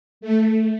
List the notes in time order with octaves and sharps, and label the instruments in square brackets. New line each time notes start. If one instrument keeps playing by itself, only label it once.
[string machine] A3